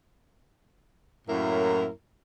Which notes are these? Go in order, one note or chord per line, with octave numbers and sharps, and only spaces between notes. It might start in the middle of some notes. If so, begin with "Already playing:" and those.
F#2 A2 A#3 E4 A#4